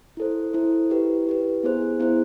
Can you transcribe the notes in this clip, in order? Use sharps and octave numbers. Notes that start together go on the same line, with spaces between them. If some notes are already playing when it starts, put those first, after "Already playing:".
E4 A4 C5
E4 A4 C5
E4 G4 B4
E4 G4 B4
B3 E4 G#4 C5
B3 E4 G#4 C5